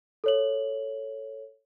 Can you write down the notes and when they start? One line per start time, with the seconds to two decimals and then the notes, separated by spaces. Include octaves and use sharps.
0.24 A4 C#5 F#7